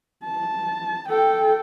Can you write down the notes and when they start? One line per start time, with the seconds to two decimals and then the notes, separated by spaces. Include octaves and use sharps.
0.24 A5
1.09 A4 G5